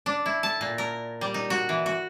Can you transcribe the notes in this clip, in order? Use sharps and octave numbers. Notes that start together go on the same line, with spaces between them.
D4
E4
A5
A#2
A#4
G3
D#4
F#4
E3
F#4